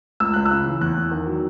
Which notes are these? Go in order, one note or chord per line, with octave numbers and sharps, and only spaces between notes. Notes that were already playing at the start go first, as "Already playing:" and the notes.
C#2 E6
C#2 F#6
E6
C#3
E3
E2 F#6
E2
D#3
F#3